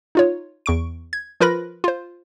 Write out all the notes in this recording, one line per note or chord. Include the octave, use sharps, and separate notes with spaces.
D#4 F4 C#5
E2 C#6 D7
G#6
F3 F4 A#4 B4 B5 A#6
F4 C5